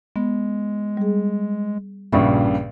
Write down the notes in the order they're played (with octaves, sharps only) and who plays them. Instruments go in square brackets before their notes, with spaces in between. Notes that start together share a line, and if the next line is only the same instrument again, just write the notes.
[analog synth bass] G#3 [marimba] B3
[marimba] G3 G#4
[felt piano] A#1 G2 C#3 [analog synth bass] A#2 [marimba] E5 B5 C#6